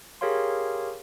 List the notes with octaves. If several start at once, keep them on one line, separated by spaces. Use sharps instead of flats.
G4 G#4 A#4 C#5 F5 C6